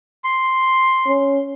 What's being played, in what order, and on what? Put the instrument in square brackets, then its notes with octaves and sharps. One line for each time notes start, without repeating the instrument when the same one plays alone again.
[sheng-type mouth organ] C6
[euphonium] C#4